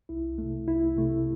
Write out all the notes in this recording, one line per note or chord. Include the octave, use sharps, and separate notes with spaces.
C2 E4
C3 A3
C2 E4
C3 A3